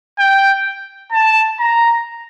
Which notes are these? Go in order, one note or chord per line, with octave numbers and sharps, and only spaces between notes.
G5
A5
A#5